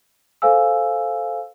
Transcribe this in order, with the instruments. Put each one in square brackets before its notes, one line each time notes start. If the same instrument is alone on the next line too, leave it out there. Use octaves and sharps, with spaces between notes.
[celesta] A4 C5 F5 G#5 E6